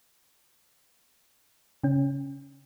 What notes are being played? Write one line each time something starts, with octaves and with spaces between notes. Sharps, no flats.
C#3 C#4